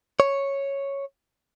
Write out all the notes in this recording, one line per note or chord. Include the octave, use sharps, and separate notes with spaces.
C#5